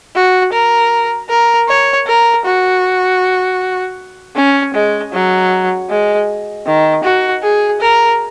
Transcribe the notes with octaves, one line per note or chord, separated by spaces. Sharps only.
F#4
A#4
A#4
C#5
A#4
F#4
C#4
G#3
F#3
G#3
D#3
F#4
G#4
A#4